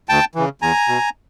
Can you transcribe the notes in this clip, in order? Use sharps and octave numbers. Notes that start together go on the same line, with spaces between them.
D2 G5 A5
C#3 E3
E2 G#5 A#5
B2